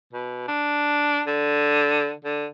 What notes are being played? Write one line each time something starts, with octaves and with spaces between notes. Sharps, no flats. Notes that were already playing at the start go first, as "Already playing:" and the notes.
B2
D4
D3
D3